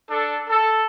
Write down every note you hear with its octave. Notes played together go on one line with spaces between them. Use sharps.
D4 A4
A4